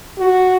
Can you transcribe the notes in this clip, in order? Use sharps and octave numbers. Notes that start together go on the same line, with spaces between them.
F#4